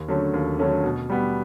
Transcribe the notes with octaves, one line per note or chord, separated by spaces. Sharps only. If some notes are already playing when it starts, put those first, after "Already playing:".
Already playing: D#2
D3 F#3 A3 C#4
D#2
D3 F#3 A3 C#4
B2
G3 B3